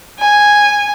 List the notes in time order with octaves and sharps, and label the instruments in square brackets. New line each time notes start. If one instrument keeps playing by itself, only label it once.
[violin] G#5